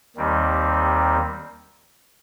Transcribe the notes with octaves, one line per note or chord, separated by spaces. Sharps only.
D#2 D#3 G3 C4